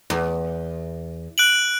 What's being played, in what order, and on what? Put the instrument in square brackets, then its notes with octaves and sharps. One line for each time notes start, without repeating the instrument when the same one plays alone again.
[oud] E2
[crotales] F#6 D7 F#7